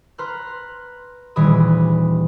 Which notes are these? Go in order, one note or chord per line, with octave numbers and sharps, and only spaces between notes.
B4 A#5 C6 F6 F#6
D#1 E3 G3 G#4 B5 D#6